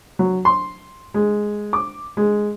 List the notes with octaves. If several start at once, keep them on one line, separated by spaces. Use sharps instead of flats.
F#3
C6
G#3
D6
G#3